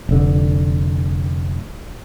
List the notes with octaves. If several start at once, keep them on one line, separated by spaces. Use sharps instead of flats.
F1 D3